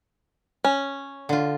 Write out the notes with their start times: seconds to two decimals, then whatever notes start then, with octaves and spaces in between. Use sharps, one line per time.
0.65 C#4
1.29 D3 F4